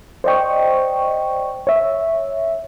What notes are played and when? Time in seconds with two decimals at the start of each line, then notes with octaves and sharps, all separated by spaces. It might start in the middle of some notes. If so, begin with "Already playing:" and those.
0.24 C5 D5 D#5 G5 C#6
1.67 C#5 E5